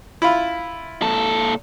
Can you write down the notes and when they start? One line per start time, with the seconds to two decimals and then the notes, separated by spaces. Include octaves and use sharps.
0.22 E4 F4
1.02 A#2 A4